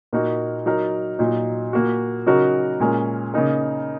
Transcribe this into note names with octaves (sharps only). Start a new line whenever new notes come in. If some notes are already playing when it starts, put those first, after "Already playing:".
A#2 A#3 D#4 F#4 A#4
F#3 D#4 A#4
A#2 F#3 D#4
A#2 A#3 F#4
C#3 F#3 D#4 F#4 A#4
A#2 G#3 C#4 A#4
C#3 A#3 D#4 A#4